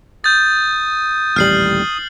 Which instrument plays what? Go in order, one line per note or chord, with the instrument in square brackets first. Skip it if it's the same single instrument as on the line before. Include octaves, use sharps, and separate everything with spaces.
[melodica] D#6 [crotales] G6 A6
[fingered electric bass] D#1 A1 G3 [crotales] F6 C7 F#7